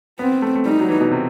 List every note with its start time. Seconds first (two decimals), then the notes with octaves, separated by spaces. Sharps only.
0.19 B3 C4
0.42 A3
0.55 A3
0.66 G3 D#4
0.80 F#3
0.88 E3
1.01 B2
1.11 C3